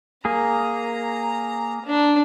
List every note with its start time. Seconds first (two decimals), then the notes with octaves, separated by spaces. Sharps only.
0.25 A#3 G#4 A#5
1.85 D4